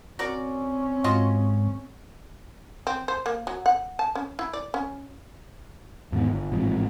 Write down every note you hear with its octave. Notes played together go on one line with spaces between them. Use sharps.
C4 C#4 F#4 A#4 D5
G#2 F4 F#4 D#5
C4
C5
A#3
F#3
F#5
A5
C#4
E4
D5
C#4
E2 G#2 D#3 B3
G1
A1 G#2 C3 F3